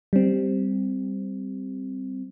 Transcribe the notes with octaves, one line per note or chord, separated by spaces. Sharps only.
G3 C4